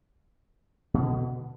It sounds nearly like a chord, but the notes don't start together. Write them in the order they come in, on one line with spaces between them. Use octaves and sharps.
B2 B3 D3